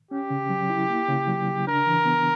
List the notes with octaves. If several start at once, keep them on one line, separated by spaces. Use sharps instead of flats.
C#4 G4
C#3
F#3
E4
A#3
C#3
F#3
C#3
D4 A#4
E3
B3